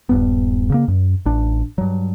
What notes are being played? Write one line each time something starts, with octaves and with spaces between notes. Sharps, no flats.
D#1 G2 B3
C#3 A#3
F#2
A1 D4
G2 F#3